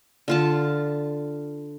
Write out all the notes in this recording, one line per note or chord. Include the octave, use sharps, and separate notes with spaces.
D3 F4 A5